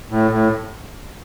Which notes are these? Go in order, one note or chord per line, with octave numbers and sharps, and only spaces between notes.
A2
A2